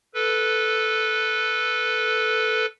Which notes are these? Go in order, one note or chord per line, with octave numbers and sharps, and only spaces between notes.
A4 B4